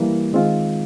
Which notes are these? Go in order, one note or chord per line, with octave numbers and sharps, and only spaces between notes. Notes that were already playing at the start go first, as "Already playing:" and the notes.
Already playing: E3 G3 A#3
D#3 G#3 C4 F4